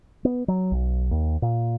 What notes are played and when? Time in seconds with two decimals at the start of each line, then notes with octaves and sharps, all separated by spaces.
0.25 B3
0.48 F#3
0.72 B1
1.11 D#2
1.42 A#2